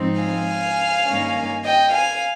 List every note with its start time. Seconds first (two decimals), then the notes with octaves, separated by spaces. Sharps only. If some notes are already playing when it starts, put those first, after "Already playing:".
Already playing: G#2 F3 C4 D#4
0.20 F5 G#5
1.06 G2 D#3 A#3 C#4
1.63 D#5 G5
1.92 F5 G#5